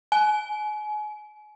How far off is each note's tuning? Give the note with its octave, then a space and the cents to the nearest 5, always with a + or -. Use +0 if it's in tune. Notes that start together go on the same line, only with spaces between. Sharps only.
G#5 +25